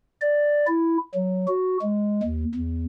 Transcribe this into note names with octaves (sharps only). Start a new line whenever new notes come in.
D5
E4
F#3
F#4
G#3
D#2
E2